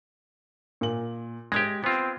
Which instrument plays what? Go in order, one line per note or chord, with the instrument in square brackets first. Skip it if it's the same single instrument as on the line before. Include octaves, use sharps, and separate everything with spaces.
[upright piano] A#2 F#7
[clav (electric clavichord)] G#3 G4 [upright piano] G#6 A#6
[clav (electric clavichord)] B3 F4 [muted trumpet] C4